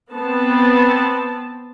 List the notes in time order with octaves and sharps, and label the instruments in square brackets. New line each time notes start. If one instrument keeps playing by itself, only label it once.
[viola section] B3 C4 A5